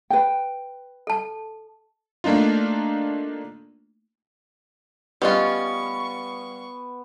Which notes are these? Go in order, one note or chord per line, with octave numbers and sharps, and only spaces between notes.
B4 G5
A4 A5
A3 A#3 D4 D#4 F4
G3 B3 C#4 F4 G4 D#5 F#5 C#6